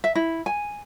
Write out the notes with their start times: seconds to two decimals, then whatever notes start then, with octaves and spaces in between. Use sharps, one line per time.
0.04 E5
0.15 E4
0.46 G#5